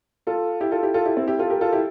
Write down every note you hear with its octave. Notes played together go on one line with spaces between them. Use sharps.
F4 A4
E4 G4
F4 A4
E4 G4
F4 A4
E4 G4
C4 E4
E4 G4
F4 A4
G4 A#4
F4 A4
E4 G4